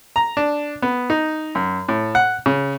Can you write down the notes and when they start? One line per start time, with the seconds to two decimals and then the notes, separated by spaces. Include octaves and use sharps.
0.16 A#5
0.37 D4
0.82 B3
1.10 D#4
1.55 F#2
1.88 A2
2.15 F#5
2.46 C#3